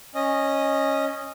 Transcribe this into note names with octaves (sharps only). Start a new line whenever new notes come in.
C#4 D#5